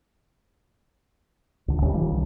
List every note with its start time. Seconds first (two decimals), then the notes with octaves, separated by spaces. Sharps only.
1.68 C#2 D3
1.82 D#1 A2 G3 C#4
1.94 D#3 F3 G3
2.12 C2 D3